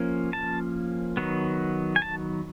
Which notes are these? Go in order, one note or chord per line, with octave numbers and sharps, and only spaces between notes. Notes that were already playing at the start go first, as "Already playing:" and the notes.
Already playing: F3 A#3 C#4
A5
D#3 F#3 B3
G#5
A5